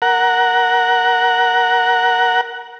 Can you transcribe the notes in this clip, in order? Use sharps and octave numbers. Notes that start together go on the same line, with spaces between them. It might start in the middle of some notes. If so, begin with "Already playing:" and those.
A#4 F#5